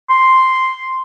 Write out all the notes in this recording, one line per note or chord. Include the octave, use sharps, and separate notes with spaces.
C6